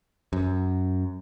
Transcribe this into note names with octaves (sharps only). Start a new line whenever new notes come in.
F#2